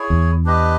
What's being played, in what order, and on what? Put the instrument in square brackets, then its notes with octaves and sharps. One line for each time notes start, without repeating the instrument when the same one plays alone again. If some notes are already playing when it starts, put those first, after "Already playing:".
Already playing: [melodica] E4 G#4 C#5
[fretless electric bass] E2
[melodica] D4 G4 B4 D#5